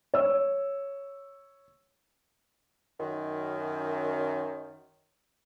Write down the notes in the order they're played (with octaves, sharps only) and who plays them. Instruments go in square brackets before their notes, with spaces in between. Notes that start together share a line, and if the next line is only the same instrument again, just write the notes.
[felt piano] C#5 E6
[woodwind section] F#2 D#3